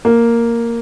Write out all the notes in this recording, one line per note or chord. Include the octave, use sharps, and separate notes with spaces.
A#3